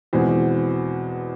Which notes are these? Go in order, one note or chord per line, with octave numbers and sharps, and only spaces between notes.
E2 B2 G#3 C4